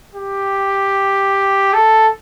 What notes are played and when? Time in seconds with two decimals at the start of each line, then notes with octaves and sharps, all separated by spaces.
0.15 G4
1.74 A4